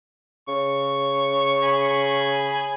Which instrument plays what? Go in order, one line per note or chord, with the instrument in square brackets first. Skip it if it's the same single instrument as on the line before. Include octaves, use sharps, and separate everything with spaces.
[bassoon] C#3 [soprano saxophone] C#6
[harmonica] G#4 G#5 B5